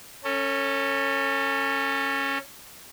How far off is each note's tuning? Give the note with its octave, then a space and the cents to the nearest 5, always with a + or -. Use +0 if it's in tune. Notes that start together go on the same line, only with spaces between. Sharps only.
C#4 -10 A4 +30